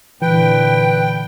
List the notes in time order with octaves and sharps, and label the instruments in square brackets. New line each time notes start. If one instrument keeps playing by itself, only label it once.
[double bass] A#2 D3 [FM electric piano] E3 [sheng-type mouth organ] B4 [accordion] G5